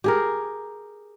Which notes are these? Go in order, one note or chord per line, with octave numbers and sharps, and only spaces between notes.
G4 G#4 A#4